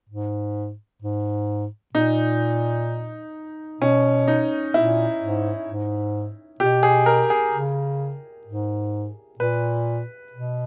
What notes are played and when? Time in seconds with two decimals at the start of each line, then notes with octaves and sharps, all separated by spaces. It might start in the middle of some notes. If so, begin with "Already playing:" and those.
0.09 G#2
1.02 G#2
1.94 A#2 D#4
3.81 B2 C#4
4.28 D#4
4.74 A#2 E4
5.20 G#2
5.67 G#2
6.60 B2 G4
6.83 G#4
7.06 A#4
7.30 G#4
7.53 C#3
8.47 G#2
9.39 A#2 B4
10.32 B2